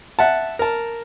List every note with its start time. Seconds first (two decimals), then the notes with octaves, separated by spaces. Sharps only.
0.19 E5 F#5 A5
0.59 A#4 A5